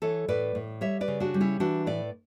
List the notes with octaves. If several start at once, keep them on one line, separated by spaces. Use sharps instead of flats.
E3 A4 C#5
A2 B4 D5
A2
G3 C#5 E5
B4 D5
C#3
D4 F#4
G3
C#4 E4
E3 D4 F#4
A2 B4 D5